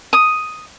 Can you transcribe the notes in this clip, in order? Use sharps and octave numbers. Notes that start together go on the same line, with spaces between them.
D#6